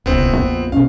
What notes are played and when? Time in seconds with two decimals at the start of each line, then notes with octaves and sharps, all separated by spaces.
0.06 D1 C2 C3 B3 C4
0.37 A#1 F2
0.72 B2 C#4 F5